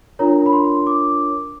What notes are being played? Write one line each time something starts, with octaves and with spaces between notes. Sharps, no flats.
D4 F4 A#4 C#5 A#5
B5
C6
D6